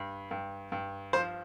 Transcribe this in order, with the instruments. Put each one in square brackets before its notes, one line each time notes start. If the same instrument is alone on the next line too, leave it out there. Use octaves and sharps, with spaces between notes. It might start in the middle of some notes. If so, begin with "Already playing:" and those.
Already playing: [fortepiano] G2
G2
G2
F3 C5